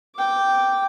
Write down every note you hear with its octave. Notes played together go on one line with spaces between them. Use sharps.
G5 D6